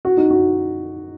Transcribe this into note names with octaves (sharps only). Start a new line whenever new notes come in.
F#4
D#4
F#4